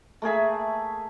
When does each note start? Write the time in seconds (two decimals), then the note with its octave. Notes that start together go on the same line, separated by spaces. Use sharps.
0.22 A3 A#3 G#4 E5